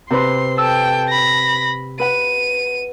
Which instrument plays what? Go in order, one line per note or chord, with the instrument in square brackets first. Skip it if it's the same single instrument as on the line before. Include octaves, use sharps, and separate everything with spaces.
[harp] C3 B4 C5 [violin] C6
[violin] A4 G5 [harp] E6
[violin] B5 A#6
[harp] B4 F#5 [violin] D#7